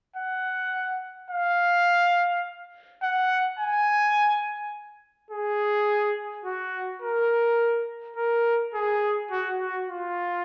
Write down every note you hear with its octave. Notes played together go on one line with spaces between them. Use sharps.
F#5
F5
F#5
G#5
G#4
F#4
A#4
A#4
G#4
F#4
F#4
F4